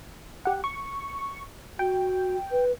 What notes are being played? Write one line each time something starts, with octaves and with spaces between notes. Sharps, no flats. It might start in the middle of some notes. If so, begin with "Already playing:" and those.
G4 F#5
C#6
F#4 G5
B4